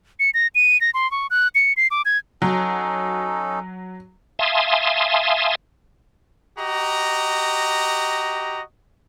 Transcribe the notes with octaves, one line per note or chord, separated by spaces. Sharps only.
C#7
A#6
D#7
A#6
C6
C#6
F#6
C#7
C7
D6
G#6
F#3 C#4 D#4 A4
E5 F5 G#5 A5 C6 D#6
F#4 G4 D#5 A#5